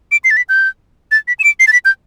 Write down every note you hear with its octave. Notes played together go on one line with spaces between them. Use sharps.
D7
C7
A6
B6
G6
A6
B6
E7
D7
C7
A6
B6
G6